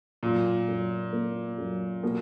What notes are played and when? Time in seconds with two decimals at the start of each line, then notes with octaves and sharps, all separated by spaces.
0.23 F#2 A#2
0.68 F#2
1.13 A#3
1.58 F#2
2.03 B2 A#3